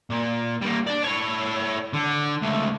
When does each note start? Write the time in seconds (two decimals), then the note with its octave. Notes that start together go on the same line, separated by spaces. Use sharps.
0.10 A#2
0.61 G3 A#3
0.87 D5 A5
1.04 E4 C#5
1.93 D3
2.42 C#2 A3